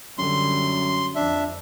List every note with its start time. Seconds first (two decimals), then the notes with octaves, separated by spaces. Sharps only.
0.18 F#2 D3 G3 C6
1.15 F2 D4 E5